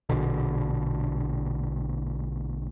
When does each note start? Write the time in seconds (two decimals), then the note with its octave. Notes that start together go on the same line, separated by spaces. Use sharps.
0.09 A#1 B2 D3